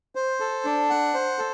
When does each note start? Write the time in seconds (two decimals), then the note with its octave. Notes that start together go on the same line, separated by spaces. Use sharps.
0.15 C5
0.40 A4
0.65 D4
0.90 F#5
1.14 C5
1.39 A4